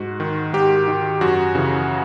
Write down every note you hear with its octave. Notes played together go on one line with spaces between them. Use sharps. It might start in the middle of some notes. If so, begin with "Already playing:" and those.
Already playing: G#2 F#4
D#3
G#2 G4
D#3
F#2 F#4
C#3 E3